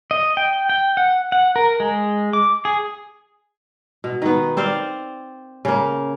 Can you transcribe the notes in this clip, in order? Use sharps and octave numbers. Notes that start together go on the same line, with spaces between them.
D#5
G5
G5
F#5
F#5
A#4
G#3
D6
G#4
B2
D#3 B3
C4 C5 D5 F5
C#3 A#3